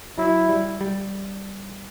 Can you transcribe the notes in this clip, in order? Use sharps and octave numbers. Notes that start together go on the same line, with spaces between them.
F#3 E4
G3
G3